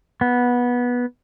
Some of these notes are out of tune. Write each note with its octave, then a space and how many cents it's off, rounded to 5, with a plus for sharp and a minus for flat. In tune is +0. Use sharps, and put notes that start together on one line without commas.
B3 -15